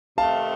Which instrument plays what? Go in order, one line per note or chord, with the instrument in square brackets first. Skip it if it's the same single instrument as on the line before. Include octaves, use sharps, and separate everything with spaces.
[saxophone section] C3 D#3 A3 C4 [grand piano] F5 A5